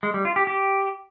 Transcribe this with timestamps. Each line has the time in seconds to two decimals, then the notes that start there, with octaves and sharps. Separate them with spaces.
0.03 G#3
0.14 G3
0.25 F4
0.36 G4
0.47 G4